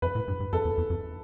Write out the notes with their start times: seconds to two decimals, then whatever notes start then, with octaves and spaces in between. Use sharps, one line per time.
0.02 F2 B4
0.15 A2
0.28 G2
0.40 G2
0.53 F2 A4
0.65 E2
0.78 E2
0.90 F2